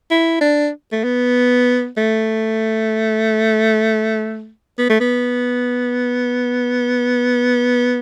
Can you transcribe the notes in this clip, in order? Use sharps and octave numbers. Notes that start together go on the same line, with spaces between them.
E4
D4
A3
B3
A3
B3
A3
B3